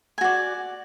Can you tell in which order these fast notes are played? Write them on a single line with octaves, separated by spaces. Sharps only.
G#5 F#4 D5